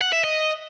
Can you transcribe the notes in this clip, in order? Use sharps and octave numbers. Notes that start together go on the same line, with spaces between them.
F#5
E5
D#5